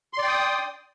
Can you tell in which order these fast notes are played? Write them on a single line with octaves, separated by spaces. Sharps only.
C6 D5 G5 D#6